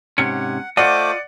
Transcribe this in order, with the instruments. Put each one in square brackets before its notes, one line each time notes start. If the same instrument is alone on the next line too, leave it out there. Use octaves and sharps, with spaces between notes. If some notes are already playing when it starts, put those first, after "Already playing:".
[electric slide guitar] G#2 C3 C#4 [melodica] F#5 [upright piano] C#7
[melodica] A3 C5 D6 [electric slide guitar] F4 D#5 [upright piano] D5 F#5